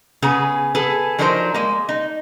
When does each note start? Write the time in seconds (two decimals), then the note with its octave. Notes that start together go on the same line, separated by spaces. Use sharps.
0.22 C#3 B3 G#4 A#5
0.75 G#4 A4 B4
1.19 F3 F#3 D4 D#4 A#4 C5
1.54 G#3 A#3
1.89 D#4